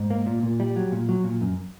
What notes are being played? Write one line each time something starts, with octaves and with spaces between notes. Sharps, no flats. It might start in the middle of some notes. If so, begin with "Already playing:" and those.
Already playing: G#2
A#3
A#2
A#2
G3
F#3
A#2
F#3
A#2
F#2